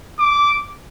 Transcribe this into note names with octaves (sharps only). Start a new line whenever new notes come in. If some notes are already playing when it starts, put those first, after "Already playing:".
D6